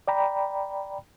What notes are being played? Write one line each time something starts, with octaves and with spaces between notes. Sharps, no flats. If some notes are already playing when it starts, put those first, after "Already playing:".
D5 G5 A#5 B5